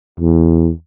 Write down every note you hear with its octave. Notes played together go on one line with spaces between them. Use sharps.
E2